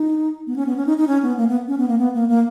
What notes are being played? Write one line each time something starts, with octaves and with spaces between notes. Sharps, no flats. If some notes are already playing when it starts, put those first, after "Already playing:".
Already playing: D#4
B3
C#4
B3
C#4
D#4
D#4
C#4
B3
A#3
B3
C#4
B3
A#3
B3
A#3
A#3